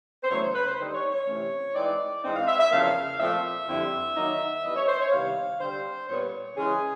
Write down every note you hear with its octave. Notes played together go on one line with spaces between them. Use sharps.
C5
E2 C#3 F#3 A3 C#5
C5
B4
C5
D3 G3 C4 D#4
C#5
C#5
C3 E3 A3 C#4
E3 G#3 C4 D#4 D5
G#2 E3 G#3 C4 D#4
F5
E5
E5
E2 C#3 F3 A#3 F5
A#2 F3 A3 C4 F4 E5
F2 D3 G3 C4 E4
D#3 F#3 A#3 D#4
E3 G3 B3 D#5
C#5
C5
C#5
C3 D#3 G3 B3 E4 F5
D3 G3 C4 C5
A#2 G3 B3 C#5
C#3 E3 G#3 C#4 G#4